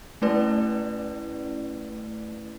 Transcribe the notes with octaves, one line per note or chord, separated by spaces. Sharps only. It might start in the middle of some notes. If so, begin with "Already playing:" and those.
A3 C#4 E4 B4 D5